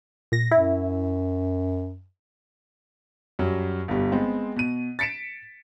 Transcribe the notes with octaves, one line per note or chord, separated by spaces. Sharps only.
A#2 A#6
F#2 E4
F#2 F#3 G3
G1 B2 G3
G#3 B3 C4
B2 D#7
A6 B6 C#7 D7 E7